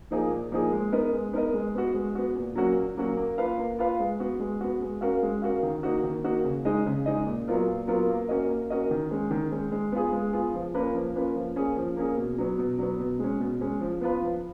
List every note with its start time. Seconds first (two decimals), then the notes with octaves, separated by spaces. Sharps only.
0.11 F3 A#3 D#4 G#4
0.31 A#2
0.52 F3 A#3 D#4 G#4
0.72 G#3
0.92 B3 D#4 A#4 D#5
1.12 G#3
1.33 B3 D#4 A#4 D#5
1.53 G#3
1.75 B3 F#4
1.94 G#3
2.15 B3 F#4
2.35 A#2
2.55 F#3 A#3 C#4 F#4
2.76 A#2
2.97 F#3 A#3 C#4 F#4
3.17 A#3
3.38 F4 B4 F5
3.58 A#3
3.79 F4 B4 F5
4.00 G#3
4.20 B3 F#4
4.40 G#3
4.61 B3 F#4
4.81 G#3
5.01 C#4 F#4 A#4 F5
5.22 G#3
5.42 C#4 F#4 A#4 F5
5.63 D#3
5.83 A#3 D#4 F#4
6.03 D#3
6.24 A#3 D#4 F#4
6.44 C#3
6.65 G#3 D#4 G#4 D#5
6.86 C#3
7.06 G#3 D#4 G#4 D#5
7.26 A#2
7.48 F#3 B3 F4 A#4
7.67 A#2
7.87 F#3 B3 F4 A#4
8.09 A#3
8.28 C#4 F#4 A#4 D#5
8.49 A#3
8.70 C#4 F#4 A#4 D#5
8.91 D#3
9.10 G#3 C#4
9.31 D#3
9.52 G#3 C#4
9.72 G#3
9.92 B3 F4 G#4
10.13 G#3
10.33 B3 F4 G#4
10.54 F3
10.74 A#3 C#4 F4 B4
10.95 F3
11.15 A#3 C#4 F4 B4
11.35 F3
11.56 A#3 C#4 G#4
11.77 F3
11.96 A#3 C#4 G#4
12.17 B2
12.38 F#3 B3
12.58 B2
12.78 F#3 B3
12.99 B2
13.19 G#3 C#4
13.40 B2
13.61 G#3 C#4
13.81 F3
14.01 B3 F4 B4
14.22 F3